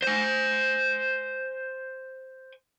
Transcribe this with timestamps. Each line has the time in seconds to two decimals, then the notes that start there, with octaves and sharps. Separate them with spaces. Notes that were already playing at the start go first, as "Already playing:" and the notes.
0.02 C5 G#5